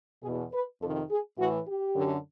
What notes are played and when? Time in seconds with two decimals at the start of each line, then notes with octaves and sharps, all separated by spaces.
0.24 B2 G#4
0.28 E2
0.53 B4
0.81 F2 C3 D#3 A4
1.10 G#4
1.38 A2 E3 F#4
1.67 G4
1.96 F#2 D3